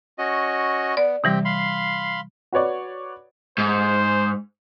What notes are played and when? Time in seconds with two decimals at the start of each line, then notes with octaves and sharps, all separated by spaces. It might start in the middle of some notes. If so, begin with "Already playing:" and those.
0.18 C#4 F#4 D#5
0.97 B3 D5
1.24 C3 E3 G3 C4 G4
1.45 F5 B5 C6
2.52 F#4 B4 C#5 D5
3.58 G#2 C5